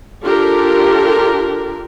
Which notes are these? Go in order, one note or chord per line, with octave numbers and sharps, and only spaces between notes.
D4 F4 G4 A4 A#4